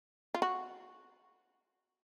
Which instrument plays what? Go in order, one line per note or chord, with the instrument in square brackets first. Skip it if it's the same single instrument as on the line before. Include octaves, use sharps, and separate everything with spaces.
[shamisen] F4
F#4